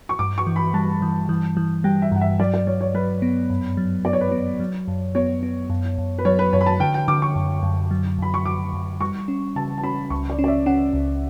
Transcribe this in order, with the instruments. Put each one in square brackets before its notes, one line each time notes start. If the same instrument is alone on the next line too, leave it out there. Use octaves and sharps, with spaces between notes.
[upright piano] C#6
[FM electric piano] G2 [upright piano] D6
[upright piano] C#6
[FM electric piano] E3
[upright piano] B5
[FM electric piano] G3 [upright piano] A5
[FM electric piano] E3
E3
E3
[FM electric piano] G3 [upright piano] G5
[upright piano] E5
[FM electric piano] G2 [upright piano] F#5
[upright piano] E5
[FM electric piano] F#3 [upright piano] D5
[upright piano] D5
[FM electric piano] F#3 [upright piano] C#5
[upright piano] C#5
[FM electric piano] F#3 [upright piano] B4
[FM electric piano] B3
F#2
F#3
[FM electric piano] B3 [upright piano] D5
[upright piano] C#5
B4
[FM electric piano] B3 [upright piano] C#5
[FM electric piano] F#3
F#2
[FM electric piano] B3 [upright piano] C#5
[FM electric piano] B3
F#2
F#2
[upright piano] B4
[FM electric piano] F#3 [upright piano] C#5
[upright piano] B4
[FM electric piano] F#2 [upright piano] C#5
[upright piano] B5
A5
[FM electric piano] D3 [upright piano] G5
[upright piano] G5
[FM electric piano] D3 [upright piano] D6
[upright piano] C#6
[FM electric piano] F#2
F#2
F#3
[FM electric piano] F#2 [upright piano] B5
[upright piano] C#6
[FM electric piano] F#2 [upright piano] D6
[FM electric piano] F#2
[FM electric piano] G3 [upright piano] C#6
[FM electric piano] C#4
[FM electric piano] C#3 [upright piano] A5
[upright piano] A5
[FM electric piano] C#4 [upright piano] B5
[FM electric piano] C#2 [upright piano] C#6
[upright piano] D5
[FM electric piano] C#4
[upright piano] D5
E5
[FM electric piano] C#4 [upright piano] F#5
[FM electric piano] C#2